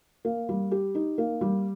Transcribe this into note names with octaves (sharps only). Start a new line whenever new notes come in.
A#3
G3
G4
D#4
A#3
G3